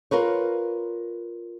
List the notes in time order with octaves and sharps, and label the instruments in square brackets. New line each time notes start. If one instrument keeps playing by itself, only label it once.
[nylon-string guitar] F4 A#4 B4 C#5